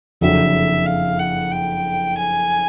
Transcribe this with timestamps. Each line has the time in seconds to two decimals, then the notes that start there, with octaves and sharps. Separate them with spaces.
0.21 F#1 F2 D3 F#3 E5
0.86 F5
1.19 F#5
1.52 G5
2.18 G#5